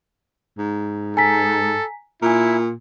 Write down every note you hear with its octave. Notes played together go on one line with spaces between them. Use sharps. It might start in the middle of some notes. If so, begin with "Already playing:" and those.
G#2
A4 G#5 A#5 B6
A#2 E4 G#5 A#5